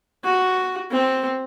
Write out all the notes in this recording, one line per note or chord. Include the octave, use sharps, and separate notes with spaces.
F#4
C4